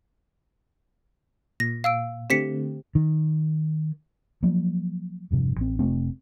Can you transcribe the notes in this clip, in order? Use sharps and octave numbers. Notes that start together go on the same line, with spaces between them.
A#2 A#6
F5 E6 D7
D3 A3 C4 G4 B6 C#7
D#3
F3 F#3 A#3
E1 G2 C3 F3
A1 C4
F1 C3 A3 C4